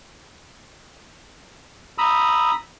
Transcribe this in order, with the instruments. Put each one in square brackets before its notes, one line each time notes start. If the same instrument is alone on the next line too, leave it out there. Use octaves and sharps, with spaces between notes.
[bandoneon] A#5 B5 D#6 E6